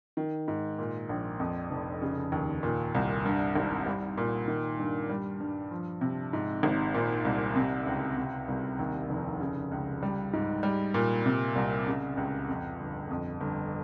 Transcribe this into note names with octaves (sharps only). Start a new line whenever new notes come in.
D#3
G#2
A#2
A#1
F2
F1
C#3
D#2
A#2
C2
G2
G#1
G3
A#2
D#3
G2
G3
G2
F3
C3
G#2
G#1
A#2
C2
C3
C#2
C3
C2
D#2
F1
C#3
C#2
G3
G#2
G3
A#2
C3
C2
C#3
C#2
F2
G1
F2
G1